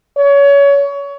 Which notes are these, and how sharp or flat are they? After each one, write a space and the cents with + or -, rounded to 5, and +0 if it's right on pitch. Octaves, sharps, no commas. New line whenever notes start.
C#5 +25